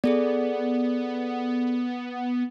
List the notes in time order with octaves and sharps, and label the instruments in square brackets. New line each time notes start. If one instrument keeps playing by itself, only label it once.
[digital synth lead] B3 [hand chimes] G#4 A4 D5